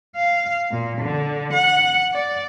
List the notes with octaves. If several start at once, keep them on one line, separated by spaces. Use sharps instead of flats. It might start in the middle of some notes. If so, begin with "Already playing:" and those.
F5
A#2
D3
F#5
D5